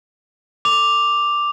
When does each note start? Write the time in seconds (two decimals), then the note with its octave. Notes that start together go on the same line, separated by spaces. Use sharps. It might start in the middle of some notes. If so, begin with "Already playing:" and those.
0.65 D6 F7